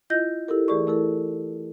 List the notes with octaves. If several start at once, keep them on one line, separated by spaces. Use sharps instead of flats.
E4 F4 D#5 G6 A#6
E4 G4 A4 A#4
E3 A3 G#4 D5 C#6
A3 E4 A4 A#4